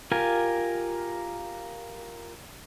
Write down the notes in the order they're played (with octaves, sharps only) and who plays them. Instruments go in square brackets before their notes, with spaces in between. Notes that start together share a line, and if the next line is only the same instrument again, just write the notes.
[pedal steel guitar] F4 G4 A#4 G#5